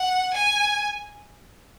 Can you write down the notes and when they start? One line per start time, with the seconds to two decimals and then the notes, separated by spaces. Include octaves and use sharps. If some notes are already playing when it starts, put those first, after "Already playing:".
Already playing: F#5
0.34 G#5